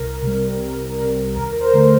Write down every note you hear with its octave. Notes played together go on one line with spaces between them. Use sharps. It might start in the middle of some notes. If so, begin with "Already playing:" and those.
Already playing: C2 A#4
C3 G3
C2
C3 G3
D#2 A#4
A#4
C5
D3 A3